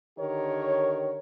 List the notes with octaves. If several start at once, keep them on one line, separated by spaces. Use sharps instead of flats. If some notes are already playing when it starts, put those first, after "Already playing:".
D3 D#3 G4 A#4 C#5